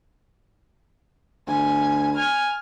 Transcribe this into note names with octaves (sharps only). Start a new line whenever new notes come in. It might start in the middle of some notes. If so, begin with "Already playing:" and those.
D2 G#5
G#5 F6